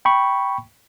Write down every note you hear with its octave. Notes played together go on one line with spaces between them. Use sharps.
G5 B5 C#6